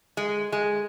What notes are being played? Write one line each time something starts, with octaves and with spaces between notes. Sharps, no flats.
G#3
G#3